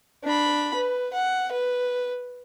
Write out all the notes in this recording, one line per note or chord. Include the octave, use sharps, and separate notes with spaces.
D4 B5
B4
F#5
B4